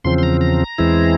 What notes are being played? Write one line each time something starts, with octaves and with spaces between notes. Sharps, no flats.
E2 C#3 F3 C4 C6
C6
A#5
A#5
E2 E3 G#3 C4 E4